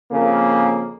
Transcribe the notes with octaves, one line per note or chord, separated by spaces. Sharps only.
F2 C#3 A#3